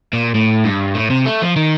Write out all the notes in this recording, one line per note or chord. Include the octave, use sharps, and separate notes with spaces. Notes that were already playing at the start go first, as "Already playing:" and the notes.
A#2
A2
G2
A2
C3
A3
F3
D#3